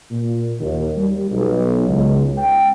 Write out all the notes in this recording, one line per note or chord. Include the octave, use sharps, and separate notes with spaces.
A#2
D#2
G3
B1
C#2
G5